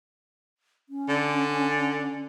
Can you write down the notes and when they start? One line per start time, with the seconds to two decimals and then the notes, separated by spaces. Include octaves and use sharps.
0.89 C#4
1.08 D3